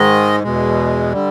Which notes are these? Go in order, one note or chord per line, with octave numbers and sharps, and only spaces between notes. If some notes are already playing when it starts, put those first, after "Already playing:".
Already playing: G#2 D#3 G#3 D#5
E2 B2 G#3
D3 G3